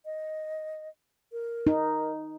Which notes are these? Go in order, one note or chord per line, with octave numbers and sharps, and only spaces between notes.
D#5
A#4
D#4